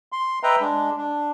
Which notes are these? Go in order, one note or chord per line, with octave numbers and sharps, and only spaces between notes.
C6
B4 D#5 E5 G5 A#5
G#3 D4
D4